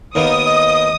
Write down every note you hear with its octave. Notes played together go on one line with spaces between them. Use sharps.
D#2 A#3 B3 D#4 D#6
D#5